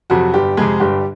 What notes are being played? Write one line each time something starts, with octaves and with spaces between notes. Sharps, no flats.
F2 C3 F#3 F#4
G1 G3 G4
F2 C3 G#3 G#4
G1 G3 G4